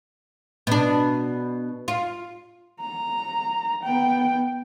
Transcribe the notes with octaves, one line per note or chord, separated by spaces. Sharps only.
B2 D4
F4
A#5
B3 G5